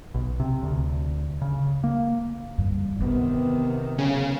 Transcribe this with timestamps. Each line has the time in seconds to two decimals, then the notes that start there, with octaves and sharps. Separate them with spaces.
0.14 B1
0.40 C3
0.63 D2
1.42 C#3
1.84 A#3
2.58 G2 E3
3.00 C3 D#3 B3 D4
3.98 B1 C#3